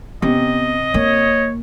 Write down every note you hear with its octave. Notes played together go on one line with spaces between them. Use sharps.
C3 B3 C#4 D#5
A#3 C#5